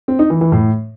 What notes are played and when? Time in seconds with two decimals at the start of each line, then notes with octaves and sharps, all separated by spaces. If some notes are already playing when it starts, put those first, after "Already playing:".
0.08 C4
0.19 D#4
0.30 E3
0.41 E3
0.52 A2